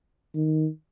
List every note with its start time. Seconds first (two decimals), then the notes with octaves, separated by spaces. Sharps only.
0.35 D#3